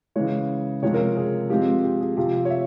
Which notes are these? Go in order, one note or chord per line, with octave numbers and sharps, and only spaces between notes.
C#3 E3 G#3 C#5
C3 F3 G#3 C4 C#5
A#4
G#4
F3 G#3 C4 G4
G4
G#4
C3 F3 C4 G4
C#5
E5